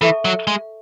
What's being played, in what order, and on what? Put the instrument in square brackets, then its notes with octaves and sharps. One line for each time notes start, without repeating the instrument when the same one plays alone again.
[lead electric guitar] E3 [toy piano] A4 E5 A5 C#6
[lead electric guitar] F#3
G#3